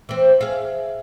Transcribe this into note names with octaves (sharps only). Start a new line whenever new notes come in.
E3 C4
G#4 E5 F5